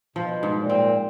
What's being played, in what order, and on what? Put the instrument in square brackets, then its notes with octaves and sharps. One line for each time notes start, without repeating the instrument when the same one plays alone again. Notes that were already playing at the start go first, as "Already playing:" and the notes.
[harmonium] B2 [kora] F3
[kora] G#2
[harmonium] A#2
[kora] C4